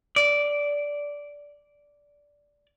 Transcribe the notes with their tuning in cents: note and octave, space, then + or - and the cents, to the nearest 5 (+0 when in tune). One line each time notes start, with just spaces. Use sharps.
D5 -10